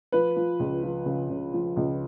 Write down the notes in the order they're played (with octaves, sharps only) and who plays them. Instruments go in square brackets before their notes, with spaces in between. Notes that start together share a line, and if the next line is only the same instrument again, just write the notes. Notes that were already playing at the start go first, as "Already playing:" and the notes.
[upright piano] F3 B4
F3
C#2
F3
C#3
C#3
F3
C#2